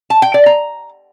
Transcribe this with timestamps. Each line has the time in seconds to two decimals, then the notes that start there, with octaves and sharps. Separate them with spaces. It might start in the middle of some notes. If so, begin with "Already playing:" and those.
0.10 A5
0.22 G5
0.34 D5
0.46 A#5